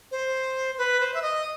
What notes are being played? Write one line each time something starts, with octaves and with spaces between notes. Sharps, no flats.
C5
B4
C5
E5
D#5